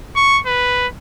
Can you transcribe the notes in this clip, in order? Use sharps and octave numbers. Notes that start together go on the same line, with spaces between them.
C#6
B4